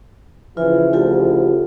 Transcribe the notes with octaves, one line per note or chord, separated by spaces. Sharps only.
C#3 E3 F3 E4 F4
D2 F4 G4 A4